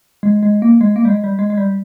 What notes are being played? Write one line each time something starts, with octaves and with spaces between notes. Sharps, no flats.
G#3
G#3
A#3
G#3
A#3
G3
G#3
G3
G#3
G#3
G3